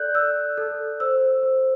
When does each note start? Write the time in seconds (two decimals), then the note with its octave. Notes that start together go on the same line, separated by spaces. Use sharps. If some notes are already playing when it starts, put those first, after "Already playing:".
Already playing: A4 D5 F#6 G6
0.15 D5 E6
0.58 A4
1.00 C5 E6
1.43 C5